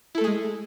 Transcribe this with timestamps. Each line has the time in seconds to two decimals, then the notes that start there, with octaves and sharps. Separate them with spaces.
0.15 E4
0.18 A4
0.21 A3
0.24 G#4
0.27 G#3